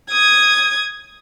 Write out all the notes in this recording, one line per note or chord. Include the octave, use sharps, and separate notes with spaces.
D#6 G#6